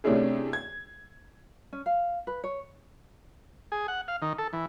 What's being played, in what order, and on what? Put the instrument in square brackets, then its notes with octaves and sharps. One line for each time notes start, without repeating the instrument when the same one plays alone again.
[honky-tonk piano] C3 A3 C#4 D4 E4 G#4
G#6
[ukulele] C#4
F5
B4
C#5
[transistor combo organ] G#4
F#5
F5
D#3
A4
E3